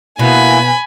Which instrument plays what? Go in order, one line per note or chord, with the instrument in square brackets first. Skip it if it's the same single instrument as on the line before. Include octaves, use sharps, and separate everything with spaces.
[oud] B2 [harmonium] A#3 B3 E4 [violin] G#5 B5